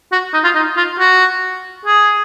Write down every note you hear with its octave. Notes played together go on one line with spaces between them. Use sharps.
F#4
D#4
F4
D#4
F4
F#4
G#4